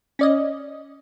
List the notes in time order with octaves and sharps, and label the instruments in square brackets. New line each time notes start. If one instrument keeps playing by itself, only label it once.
[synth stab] C#4 D5 D#5